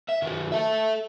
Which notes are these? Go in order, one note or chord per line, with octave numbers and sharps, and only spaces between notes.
E5
D#3 F#3
A4 E5